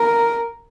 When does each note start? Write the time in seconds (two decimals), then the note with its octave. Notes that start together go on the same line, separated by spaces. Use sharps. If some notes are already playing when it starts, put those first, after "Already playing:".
Already playing: A#4